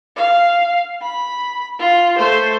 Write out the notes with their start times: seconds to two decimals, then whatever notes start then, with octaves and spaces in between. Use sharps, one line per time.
0.16 F5
1.02 B5
1.79 F4
2.18 A3 C5